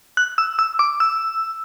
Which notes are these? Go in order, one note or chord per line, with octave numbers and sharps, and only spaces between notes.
F#6
E6
E6
D6
E6